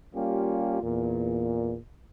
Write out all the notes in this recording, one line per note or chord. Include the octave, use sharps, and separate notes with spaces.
G3 A#3 C#4 F4 G4
E2 A#2